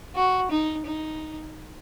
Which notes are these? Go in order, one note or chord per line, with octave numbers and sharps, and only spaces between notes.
F#4
D#4
D#4